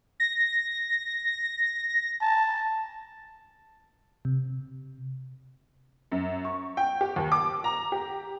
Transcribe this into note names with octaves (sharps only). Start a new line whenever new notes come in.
A#6
A5
C3
F#2
C#6
G5
G4
D#2
D6
A#5
G4